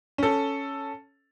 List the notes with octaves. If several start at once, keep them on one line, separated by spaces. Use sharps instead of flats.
C#4 A4